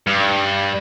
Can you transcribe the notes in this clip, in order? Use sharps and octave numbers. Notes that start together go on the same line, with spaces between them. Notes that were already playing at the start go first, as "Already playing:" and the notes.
G2